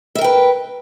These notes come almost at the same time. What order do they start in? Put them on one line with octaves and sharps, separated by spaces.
E5 A#4 G5 B4